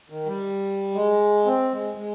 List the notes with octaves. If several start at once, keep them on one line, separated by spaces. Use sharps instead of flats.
D#3
G3
G#3
C4
G#3
G#3